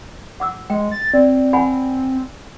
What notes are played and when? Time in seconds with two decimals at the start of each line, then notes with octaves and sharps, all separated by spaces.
0.40 F#5 D6 E6
0.70 G#3 G5
0.92 A6
1.13 C4 D5
1.53 F#5 G#5 B5